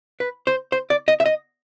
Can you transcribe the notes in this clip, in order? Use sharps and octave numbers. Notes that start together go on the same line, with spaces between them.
B4
C5
C5
D5
D#5
E5
D#5